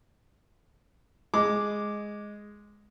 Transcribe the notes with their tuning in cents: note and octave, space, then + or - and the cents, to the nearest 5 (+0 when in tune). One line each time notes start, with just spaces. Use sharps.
G#3 +0 D6 +0